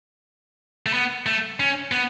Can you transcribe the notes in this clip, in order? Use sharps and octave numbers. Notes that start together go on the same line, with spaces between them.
A3
B3
A3
C#4
B3